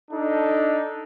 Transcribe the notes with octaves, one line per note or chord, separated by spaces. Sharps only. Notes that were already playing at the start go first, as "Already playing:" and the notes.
D4 D#4 A4